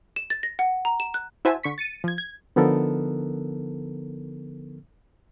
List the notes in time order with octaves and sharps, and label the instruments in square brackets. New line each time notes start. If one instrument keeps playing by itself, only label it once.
[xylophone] E7
A6
A#6
F#5
A#5
E7
F#6
[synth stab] E4 F#4 C5 E5 G#5 A5
D3 C#6 B6
A6 C#7 D#7
F3 G#6
G#6
[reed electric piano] D3 F3 B3 D#4 A4 A#4